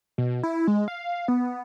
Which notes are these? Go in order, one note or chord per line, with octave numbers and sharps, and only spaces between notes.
B2
E4
G#3
F5
B3